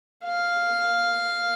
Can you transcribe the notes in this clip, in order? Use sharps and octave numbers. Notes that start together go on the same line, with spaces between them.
F5